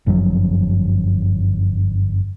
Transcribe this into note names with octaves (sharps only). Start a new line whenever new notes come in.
G1 F#2 F3 F#3